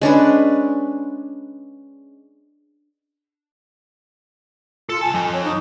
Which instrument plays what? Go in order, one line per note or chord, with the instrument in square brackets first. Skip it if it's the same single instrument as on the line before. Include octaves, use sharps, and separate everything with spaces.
[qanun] G#3 C#4 D4 B4
[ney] F4 [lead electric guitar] A4
[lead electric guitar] C2 A5 [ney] G#5
[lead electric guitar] F2 [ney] G#5
[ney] C#5
D#4